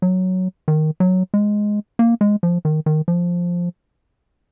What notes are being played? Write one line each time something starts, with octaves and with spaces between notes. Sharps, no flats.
F#3
D#3
F#3
G#3
A#3
G#3
F3
D#3
D#3
F3